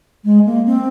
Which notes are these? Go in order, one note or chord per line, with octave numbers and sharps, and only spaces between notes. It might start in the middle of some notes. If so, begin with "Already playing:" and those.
G#3
A#3
C4